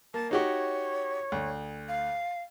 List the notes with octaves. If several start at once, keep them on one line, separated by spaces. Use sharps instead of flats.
A#3 A5
D#4 F#4 G4 C#5
D2
F5